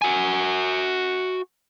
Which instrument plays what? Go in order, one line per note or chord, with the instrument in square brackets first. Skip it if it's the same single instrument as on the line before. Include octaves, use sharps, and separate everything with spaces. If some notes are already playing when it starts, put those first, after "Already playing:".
[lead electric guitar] F#4 G#5